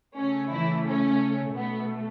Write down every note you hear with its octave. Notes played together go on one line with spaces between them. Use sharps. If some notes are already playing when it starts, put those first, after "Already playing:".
C#3 A3 C#4
E3 E4
C#4
B2 A3 B3